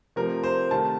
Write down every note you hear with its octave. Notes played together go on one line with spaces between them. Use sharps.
C3 F3 A3 A#4
C5
C3 D#3 A3 A5